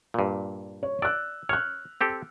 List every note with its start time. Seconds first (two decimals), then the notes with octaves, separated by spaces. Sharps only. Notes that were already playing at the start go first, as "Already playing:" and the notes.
0.14 G2 A#2
0.83 C#5
1.02 D5 E6 F#6
1.49 C#5 F6 F#6
2.01 C4 G4 A4